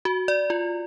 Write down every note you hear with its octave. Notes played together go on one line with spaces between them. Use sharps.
F#4
D5
F4